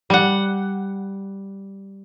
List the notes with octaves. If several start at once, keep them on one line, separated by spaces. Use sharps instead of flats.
G3 F#5